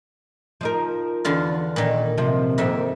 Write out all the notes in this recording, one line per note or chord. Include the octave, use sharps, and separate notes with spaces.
F3 D#4 A#4
E2 D3 F4
A#2 D#3
C3 F3
F2 G#2 D#3 A#3 E5